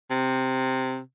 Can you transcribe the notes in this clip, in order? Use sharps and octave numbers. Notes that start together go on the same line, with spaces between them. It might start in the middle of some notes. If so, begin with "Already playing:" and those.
C3